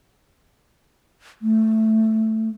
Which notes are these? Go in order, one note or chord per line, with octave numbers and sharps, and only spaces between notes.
A3